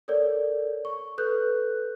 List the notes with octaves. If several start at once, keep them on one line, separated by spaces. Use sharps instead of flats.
A4 A#4 C#5 D5
C#6
A4 B4 F#6 G6